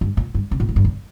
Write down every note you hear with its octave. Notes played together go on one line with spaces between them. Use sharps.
G2
A#2
G2
C#3
A#2
A2
G2
E2